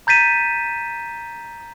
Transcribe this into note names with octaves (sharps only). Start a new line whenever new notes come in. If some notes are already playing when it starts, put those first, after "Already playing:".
A#5 G6 A6 B6 D#7 E7